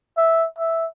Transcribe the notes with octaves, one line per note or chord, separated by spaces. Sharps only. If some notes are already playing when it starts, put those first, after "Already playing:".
E5
E5